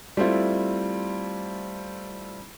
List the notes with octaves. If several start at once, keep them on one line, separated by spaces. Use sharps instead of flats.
G3 A3 C4 E4 F4